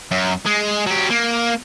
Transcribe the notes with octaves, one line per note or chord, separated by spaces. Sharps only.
F#2
G#3
F#3 G4
A#3